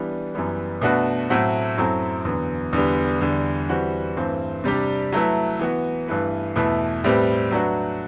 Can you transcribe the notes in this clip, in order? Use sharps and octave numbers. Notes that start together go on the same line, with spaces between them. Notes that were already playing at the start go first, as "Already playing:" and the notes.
Already playing: E3 G3 B3 D4
F#2 E3 G3 B3
B2 A3 D4 F#4 B4
A2 F#3 A3 C4 F#4
F#2 F#3 C4 E4 A4
E2 D3 F#3 B3
E2 D3 G3 B3
E2 D3 G3
E3 G3 C4 F#4
G2 E3 A3 C4
C3 G3 D4 G4
F#3 A3 E4 B4
E3 B3 F#4
G2 E3 A3 E4 B4
E2 B2 A3 E4 B4
A2 G3 C4 G4 B4
F#3 A3 D4 F#4 B4